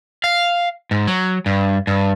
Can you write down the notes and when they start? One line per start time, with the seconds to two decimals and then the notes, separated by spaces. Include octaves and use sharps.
0.24 F5
0.91 G#2
1.07 F#3
1.46 G2
1.87 G2